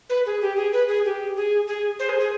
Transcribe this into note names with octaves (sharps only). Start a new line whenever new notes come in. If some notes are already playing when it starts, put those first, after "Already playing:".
B4
G#4
G4
G#4
B4
G#4
G4
G#4
G#4
C5
G#4
G#4